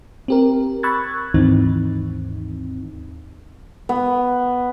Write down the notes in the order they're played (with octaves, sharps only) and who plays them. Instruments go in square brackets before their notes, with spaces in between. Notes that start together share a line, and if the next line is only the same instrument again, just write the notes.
[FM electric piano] C4 G4 A#4
B5 C#6 E6 F#6 G#6 A6
D#2 G#2 D#3 E3 C4 D#4
[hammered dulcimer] B3